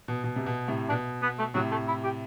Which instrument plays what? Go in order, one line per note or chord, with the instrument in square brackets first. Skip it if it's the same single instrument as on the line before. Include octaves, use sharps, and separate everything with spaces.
[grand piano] B2
B2
C3
B2
A2 C3
[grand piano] B2 [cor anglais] D4
[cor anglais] B3
A3
[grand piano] A2 C3 [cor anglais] F#3
[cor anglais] A3
E4
G4